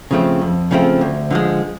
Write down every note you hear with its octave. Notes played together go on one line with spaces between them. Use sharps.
C#3 F3 A3 C4
F2
C#3 F3 A3 C4
D2
D3 F3 G#3